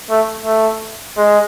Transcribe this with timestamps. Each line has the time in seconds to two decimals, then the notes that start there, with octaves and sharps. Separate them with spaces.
0.10 A3
0.46 A3
1.17 G#3